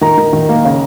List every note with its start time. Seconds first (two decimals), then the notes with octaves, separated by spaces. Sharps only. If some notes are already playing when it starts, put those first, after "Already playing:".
0.01 D#3 A#5
0.18 D#3
0.33 D#3
0.49 A#3
0.64 C#3